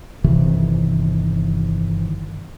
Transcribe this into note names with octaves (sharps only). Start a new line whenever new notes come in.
G1 C3 D#3 E3